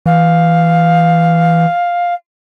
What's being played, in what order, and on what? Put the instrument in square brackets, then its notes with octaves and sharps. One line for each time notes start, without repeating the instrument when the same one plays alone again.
[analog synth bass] E3 [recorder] F5